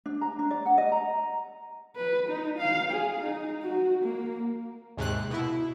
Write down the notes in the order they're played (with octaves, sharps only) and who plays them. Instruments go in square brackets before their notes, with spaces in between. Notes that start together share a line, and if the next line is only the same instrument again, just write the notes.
[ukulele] D4
A#5
D4
D5
F#5
D#5
A#5
[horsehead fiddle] B4
D#4
F5
G#4
D#4
F#4
A#3
[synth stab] D#2 G#2 C3 F#6
B2 E4